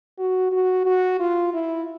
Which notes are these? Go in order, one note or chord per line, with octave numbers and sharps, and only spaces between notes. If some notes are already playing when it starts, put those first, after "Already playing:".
F#4
F#4
F#4
F4
E4